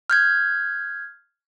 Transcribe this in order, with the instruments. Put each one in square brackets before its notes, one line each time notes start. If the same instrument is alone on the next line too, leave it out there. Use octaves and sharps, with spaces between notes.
[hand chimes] F6 G6 G#6